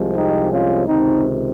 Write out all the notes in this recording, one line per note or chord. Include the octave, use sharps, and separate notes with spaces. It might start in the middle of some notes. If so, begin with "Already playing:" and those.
Already playing: C2 C3 F3 G#3
D#4 G4
C#4 F4
C#2 C3 D#3 C4 D#4